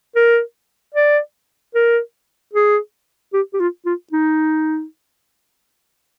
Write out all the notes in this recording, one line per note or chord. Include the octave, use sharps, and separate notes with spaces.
A#4
D5
A#4
G#4
G4
G4
F4
F4
D#4